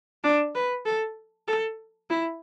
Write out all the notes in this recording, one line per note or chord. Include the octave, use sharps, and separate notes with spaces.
D4
B4
A4
A4
E4